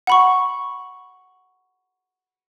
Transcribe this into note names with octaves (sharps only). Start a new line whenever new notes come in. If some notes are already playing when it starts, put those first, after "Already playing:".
F#5 B5 C#6